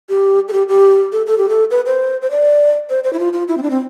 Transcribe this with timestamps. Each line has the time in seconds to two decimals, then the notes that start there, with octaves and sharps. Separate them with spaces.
0.09 G4
0.48 A4
0.53 G4
0.69 G4
1.12 A4
1.27 A4
1.38 G4
1.49 A4
1.71 B4
1.86 C5
2.22 C5
2.31 D5
2.90 C5
3.04 C5
3.13 E4
3.19 F4
3.33 F4
3.48 E4
3.58 C4
3.63 D4
3.70 C4